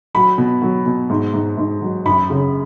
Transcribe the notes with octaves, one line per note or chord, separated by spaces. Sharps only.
F#3 B5
B2
F#3
B2
G#2
G#2
G#2
F#3
F#2 B5
C#3